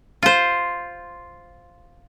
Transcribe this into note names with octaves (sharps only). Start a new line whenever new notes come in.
F4 C5